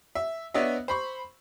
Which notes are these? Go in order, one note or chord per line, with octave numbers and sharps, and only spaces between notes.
E5
B3 D4 C#5 D#5 E5
C5 B5 C#6